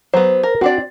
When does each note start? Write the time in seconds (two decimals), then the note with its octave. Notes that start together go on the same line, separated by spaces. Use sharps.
0.14 F#3 B3 C5
0.43 A#4
0.61 C4 D4 F#4 D5